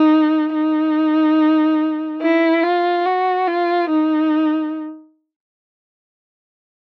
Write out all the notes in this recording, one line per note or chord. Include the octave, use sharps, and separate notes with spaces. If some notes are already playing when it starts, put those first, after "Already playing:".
Already playing: D#4
D#4
E4
F4
F#4
F4
D#4